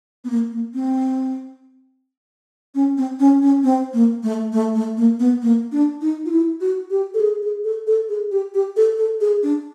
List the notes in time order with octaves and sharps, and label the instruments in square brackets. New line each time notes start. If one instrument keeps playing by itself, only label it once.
[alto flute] B3
A#3
A#3
C4
C#4
C4
C#4
C#4
C4
A#3
A3
A3
A3
A#3
B3
A#3
D4
D#4
F4
E4
F#4
G4
A4
G#4
G#4
A4
A4
G#4
G4
G4
A4
A4
G#4
D4